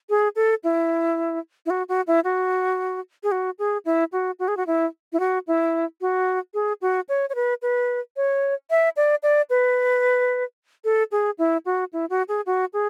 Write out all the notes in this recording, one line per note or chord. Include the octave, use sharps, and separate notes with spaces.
G#4
A4
E4
E4
F#4
F#4
E4
F#4
G#4
F#4
G#4
E4
F#4
F#4
G#4
F#4
E4
E4
F#4
E4
F#4
G#4
F#4
C#5
C#5
B4
B4
C#5
E5
D5
D5
B4
A4
G#4
E4
F#4
E4
F#4
G#4
F#4
G#4